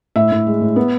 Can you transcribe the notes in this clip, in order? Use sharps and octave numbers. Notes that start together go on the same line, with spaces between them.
A2 E5
A2
G#3
A2
B3